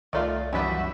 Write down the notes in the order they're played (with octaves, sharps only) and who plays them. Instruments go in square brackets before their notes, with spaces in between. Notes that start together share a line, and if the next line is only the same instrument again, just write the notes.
[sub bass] C2 [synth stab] D#3 A3 F4 [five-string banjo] F3 D5
[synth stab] F#2 E3 B4 [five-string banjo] D#3 G3 [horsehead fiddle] F#4 E5